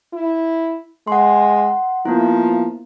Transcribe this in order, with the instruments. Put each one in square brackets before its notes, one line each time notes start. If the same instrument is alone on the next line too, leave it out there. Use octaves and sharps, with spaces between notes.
[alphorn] E4
[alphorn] G#3 [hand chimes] F#5 C6
[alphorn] F3 [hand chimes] A#3 B3 E4